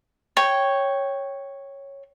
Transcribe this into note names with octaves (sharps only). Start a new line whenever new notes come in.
C#5 G5